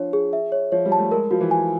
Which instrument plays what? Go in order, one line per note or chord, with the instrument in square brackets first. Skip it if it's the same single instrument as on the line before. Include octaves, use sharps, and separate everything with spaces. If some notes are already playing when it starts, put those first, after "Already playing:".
Already playing: [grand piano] F3 [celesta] D4 C#5
[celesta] G#4
E5
C#5
[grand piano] F3 [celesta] C#5
[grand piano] G3
[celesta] A5
[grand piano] A3
[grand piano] G#3 [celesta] A#4
[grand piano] F3 [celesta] F#4
[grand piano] E3
[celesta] G#5